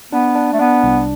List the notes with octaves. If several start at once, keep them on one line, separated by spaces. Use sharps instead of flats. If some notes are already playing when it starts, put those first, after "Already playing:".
B3 D4
D4
A3
B3 D4
C2